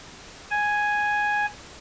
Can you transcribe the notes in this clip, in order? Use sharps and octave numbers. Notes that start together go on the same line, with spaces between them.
G#5